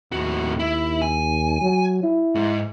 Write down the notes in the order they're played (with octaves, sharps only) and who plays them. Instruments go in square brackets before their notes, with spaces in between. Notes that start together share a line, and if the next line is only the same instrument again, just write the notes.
[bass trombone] D#2 [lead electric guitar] A2 F#4
[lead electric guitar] E4
G#5
[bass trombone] F#3
E4
[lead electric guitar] G#2